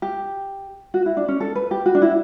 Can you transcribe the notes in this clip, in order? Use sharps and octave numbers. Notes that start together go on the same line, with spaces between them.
G4
F#4
E4
D4
C#4
A4
B4
G4
F#4
D4
E4